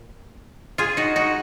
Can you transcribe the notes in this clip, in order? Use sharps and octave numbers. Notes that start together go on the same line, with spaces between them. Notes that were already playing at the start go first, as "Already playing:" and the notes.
Already playing: A#2
F4 G#4
D#4 F#4
D#4 F#4